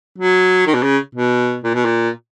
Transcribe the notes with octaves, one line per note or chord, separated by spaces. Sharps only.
F#3
D#3
B2
C#3
B2
A#2
B2
A#2